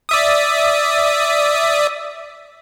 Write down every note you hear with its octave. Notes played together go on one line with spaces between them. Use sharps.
D5 E5 D#6